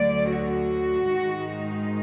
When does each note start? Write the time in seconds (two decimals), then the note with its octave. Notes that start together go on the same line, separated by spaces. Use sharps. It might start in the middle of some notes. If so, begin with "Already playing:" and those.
Already playing: D2 D3 F#3 D5
0.30 F#4
1.10 G#2 D#3 G#3 D#4